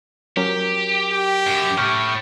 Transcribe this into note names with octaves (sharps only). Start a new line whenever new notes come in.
F#3 C#4 G4 A#4
G4
F#2
A2 C#6 F6 G6